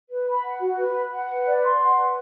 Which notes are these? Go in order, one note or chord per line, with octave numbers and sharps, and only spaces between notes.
B4
B5
F#5
F#4
B4
B5
F#5
B4
D5
C6
F#5
B4